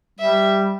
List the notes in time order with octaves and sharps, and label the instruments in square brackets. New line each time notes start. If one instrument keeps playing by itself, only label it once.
[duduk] G3 [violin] E5